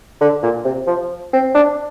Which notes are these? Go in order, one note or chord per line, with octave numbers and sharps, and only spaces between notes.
D3
A#2
C3
F3
C4
D4